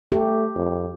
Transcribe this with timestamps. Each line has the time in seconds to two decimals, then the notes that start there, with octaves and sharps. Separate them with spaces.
0.12 A3 G4
0.56 F2